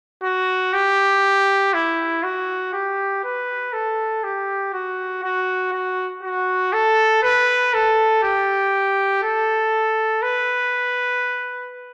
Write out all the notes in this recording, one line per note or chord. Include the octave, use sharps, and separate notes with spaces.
F#4
G4
E4
F#4
G4
B4
A4
G4
F#4
F#4
F#4
F#4
A4
B4
A4
G4
A4
B4